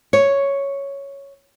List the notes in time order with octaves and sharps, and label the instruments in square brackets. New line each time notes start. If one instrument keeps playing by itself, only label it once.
[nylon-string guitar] C#5